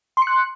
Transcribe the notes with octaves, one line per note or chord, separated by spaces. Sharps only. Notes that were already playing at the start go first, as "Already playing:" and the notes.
C6 F#6 C#7